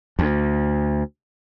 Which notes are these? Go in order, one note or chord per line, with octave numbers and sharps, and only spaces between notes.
D2